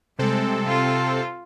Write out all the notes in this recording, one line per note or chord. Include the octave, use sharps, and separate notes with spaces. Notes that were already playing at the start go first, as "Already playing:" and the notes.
C3 G3 G#3 C4 A4
F4